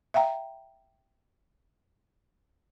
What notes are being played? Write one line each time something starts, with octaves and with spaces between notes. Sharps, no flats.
E5 F5 G5 A#5